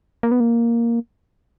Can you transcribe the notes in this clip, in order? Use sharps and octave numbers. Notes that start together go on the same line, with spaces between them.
A#3
B3
A#3